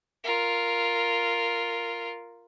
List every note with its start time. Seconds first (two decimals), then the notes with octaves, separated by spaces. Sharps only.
0.24 F4 A#4